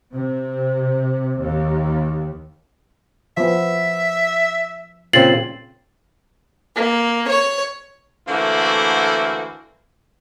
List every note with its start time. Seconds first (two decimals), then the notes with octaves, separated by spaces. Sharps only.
0.14 C3
1.41 D#2
3.37 F3 B3 E5
5.13 A#2 C#3 C4 A6 C7 F#7
6.76 A#3
7.27 C#5
8.28 D3 E3 A3 A#3 F#4 C5